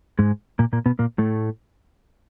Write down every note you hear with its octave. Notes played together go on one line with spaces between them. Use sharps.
G#2 G#3
A#2 A#3
A#2 A#3
B2 B3
A#2 A#3
A2 A3